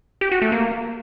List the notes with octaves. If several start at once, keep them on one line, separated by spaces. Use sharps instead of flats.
G4
F#4
A3
A#3